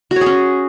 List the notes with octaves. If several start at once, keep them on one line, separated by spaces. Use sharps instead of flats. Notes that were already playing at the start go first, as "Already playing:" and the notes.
F#4
C#5
G#4
C#4